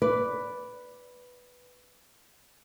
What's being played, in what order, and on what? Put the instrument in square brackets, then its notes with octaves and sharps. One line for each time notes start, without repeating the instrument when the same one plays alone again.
[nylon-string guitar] B4 D5